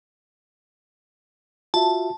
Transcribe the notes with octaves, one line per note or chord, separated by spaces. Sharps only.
F4 F#4 E5 A5